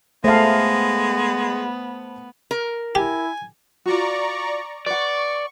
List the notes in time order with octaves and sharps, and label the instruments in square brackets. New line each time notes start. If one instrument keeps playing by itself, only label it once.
[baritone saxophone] G#3 [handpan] A3 F5 [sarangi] B3 [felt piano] C5 A5
[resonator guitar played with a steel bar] A#4
[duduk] E4 [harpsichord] G4 [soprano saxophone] G#5
[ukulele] F4 F#4 [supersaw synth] D5 A#5 C#6
[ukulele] B4 F#5 [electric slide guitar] D5 [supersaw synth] C#6